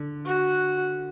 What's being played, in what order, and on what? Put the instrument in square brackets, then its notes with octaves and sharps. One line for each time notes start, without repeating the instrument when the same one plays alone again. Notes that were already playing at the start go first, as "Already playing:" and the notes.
Already playing: [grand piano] D3
[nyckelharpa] F#4